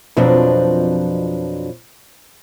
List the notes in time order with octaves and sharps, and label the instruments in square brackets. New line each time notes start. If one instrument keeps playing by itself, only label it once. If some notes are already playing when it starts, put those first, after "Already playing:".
[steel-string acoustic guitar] F2 B2 F3 F#3 C4 D4